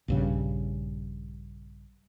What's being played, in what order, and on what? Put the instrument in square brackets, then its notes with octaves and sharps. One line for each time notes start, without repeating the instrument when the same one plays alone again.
[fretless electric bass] A#1 G2 C#3